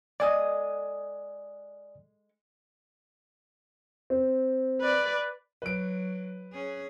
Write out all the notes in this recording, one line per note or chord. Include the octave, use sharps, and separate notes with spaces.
G#3 A4 D5 D#5 G#5 D#6
C4
B4 D5
F#3 B4 D7
C#4 G#4